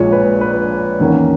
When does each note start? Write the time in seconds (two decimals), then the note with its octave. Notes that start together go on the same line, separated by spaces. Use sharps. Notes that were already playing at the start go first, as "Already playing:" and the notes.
Already playing: A#1 A#2 G#3 C#5
0.12 B4
0.41 B4
1.00 E2 D#3 A#3 C#4